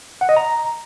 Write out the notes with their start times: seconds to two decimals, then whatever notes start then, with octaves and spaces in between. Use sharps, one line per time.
0.21 F#5
0.29 D#5
0.37 A#5